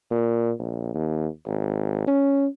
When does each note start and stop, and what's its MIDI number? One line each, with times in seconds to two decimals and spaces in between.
0.11 0.51 46
0.59 0.92 34
0.94 1.27 39
1.47 2.07 32
2.07 2.47 61